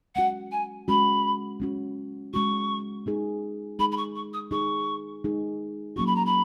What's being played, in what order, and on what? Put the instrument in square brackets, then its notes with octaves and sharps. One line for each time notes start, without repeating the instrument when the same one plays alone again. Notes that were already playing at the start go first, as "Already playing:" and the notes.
[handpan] G#3 C#4 F#4 [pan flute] F#5
[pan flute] G#5
[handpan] G#3 C#4 F#4 [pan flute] B5
[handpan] G#3 C#4 F#4
[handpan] G#3 C#4 F#4 [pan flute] C#6
[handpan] G#3 D#4 G#4
[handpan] G#3 D#4 G#4 [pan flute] B5
[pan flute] B5
C#6
C#6
D#6
[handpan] G#3 D#4 G#4 [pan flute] C#6
[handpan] G#3 D#4 G#4
[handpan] F#3 A#3 C#4 F#4 [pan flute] C#6
[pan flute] B5
A#5
B5